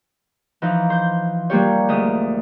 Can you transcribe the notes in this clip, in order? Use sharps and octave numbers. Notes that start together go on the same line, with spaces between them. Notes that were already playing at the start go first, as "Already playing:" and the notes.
E3 F3 D#4
C5 G6
G3 A#3 D4 F4 G4 C#5
D2 G#2 D#6